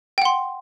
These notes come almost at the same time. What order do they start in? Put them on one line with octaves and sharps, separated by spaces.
G5 F#5 C6